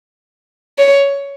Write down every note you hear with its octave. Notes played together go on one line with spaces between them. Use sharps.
C#5